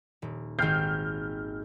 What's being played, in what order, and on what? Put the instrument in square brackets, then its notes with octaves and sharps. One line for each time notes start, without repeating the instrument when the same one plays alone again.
[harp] D#1
[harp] G#1 G5 C7 [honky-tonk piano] F6 G6